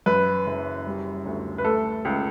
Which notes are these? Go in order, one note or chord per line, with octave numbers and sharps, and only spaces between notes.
F#2 B4
F#1
G3
D2
B4
A3 A4
C#2